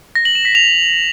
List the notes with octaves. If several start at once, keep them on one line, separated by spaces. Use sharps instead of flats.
A#6
F#7
E7
B6
F7